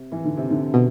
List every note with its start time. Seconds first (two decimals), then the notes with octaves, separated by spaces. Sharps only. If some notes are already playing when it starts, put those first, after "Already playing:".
Already playing: C3
0.12 E3
0.24 D3
0.37 C3
0.50 D3
0.74 B2